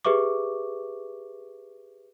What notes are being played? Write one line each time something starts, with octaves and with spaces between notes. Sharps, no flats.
G4 G#4 B4 E5 C#6 D6